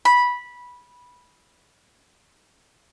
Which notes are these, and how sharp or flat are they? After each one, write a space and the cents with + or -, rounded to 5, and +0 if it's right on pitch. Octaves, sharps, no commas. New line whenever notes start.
B5 -10